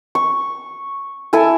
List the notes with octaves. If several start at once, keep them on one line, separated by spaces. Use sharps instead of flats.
C#6
E4 A4 G#5